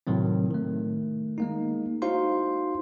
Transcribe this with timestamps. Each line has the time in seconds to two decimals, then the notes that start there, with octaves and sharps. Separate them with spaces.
0.07 A2 C3 D#3 F#3 C4
0.51 D#3 A3
1.38 G#3 A#3 D#4
2.02 D#4 E4 F#4 C5 F5 C6